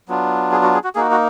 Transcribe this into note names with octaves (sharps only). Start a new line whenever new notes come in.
F#3 B3 D4 F4
G#4
F#4
G#4
F#4
A#3 D#4 F#4 G#4
F#4